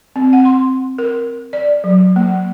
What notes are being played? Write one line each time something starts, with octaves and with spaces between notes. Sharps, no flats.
C4
F#5
C6
A#4
D5
F#3
A#3